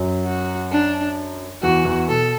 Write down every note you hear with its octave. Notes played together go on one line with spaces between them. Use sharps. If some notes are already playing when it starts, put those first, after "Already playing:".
Already playing: F#2 F#3
F#4
D4
E2 E3 F#4
E2 E3
B2 A4